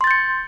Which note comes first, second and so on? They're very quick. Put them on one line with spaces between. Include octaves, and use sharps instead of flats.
C6 A6 G6 C#7